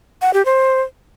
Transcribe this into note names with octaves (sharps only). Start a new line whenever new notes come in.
F#5
G4
C5